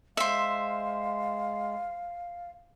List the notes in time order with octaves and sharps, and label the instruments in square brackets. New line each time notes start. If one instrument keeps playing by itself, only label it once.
[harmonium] G#3 [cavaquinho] C5 E5 [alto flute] F5